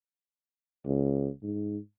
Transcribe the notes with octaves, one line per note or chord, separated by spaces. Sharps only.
C#2
G#2